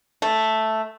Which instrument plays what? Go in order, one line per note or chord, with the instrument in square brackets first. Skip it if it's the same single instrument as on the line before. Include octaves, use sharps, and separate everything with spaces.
[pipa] A3